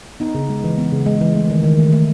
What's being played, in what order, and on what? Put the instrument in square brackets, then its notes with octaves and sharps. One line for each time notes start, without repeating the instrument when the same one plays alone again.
[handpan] B3 D#4
C#3
G#3
E3
B3
C#3
G#3
E3
A3
D#3
D#3
A3
A3